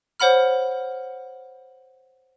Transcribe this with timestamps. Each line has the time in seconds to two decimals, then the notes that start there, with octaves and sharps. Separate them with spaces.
0.20 C5 C#5 F#5 B5 F6